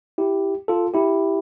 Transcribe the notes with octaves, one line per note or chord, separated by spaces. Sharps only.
E4 G4
F4 A4
E4 G4